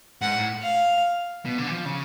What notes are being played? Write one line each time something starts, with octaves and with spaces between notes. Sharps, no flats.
G#2 F#5
A2
F5
B2
D3
E3
F3
C#3